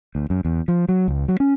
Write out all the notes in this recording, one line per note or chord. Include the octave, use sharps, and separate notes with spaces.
D2
F#2
E2
F3
F#3
C#2
F#3
C#4